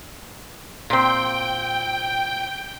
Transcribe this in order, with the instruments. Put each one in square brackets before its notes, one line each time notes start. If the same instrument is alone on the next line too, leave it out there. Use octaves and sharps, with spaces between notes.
[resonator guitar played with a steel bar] A#2 C4 [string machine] G5